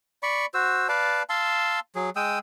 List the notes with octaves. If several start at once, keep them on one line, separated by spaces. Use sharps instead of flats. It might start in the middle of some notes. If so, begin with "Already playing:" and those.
D5 B5 C#6
F#4 C5 E6
B4 D5 F5 A5
F5 A5 C6 E6
F#3 G#4
G#3 G5 D#6 E6